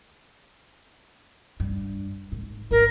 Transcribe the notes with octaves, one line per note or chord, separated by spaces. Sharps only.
G2
G#2
G#1 D3 A#4